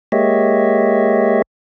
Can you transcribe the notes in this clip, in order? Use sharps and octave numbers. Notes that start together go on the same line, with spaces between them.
G#3 A#3 G4 C#5 D#5 E5